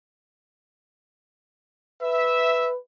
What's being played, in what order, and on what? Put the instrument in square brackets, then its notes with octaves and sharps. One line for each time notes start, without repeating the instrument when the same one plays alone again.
[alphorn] B4 [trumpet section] E5